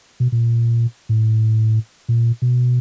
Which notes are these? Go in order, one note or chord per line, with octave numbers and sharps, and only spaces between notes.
B2
A#2
A2
A#2
B2